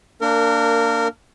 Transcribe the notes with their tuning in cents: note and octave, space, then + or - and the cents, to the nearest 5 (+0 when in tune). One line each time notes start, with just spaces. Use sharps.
A#3 -15 D4 +0 A#4 -25